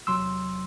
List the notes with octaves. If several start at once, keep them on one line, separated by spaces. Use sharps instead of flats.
E2 C3 F#3 C6 E6